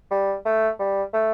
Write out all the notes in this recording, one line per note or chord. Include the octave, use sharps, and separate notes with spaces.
G3
A3
G3
A3